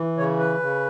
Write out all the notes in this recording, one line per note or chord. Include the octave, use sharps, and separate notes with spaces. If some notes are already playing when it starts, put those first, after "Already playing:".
Already playing: E3
C#3 C#5
B4
C#3